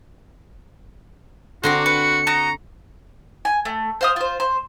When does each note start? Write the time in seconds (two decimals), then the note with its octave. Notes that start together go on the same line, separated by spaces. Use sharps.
1.64 D3 C4 F#4 A#5 C6 D6
1.86 B4 C#7
2.27 F#4 D#5 A#5
3.45 G#5
3.65 A3
4.01 C5 F5 D#6
4.16 F4 C5
4.40 C5